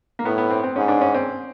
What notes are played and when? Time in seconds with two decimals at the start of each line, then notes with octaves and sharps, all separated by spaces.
0.19 A#3
0.25 A2 B3
0.38 B3
0.50 C4
0.63 C4
0.76 G#2 C#4
0.88 D4
1.01 C#4
1.14 C4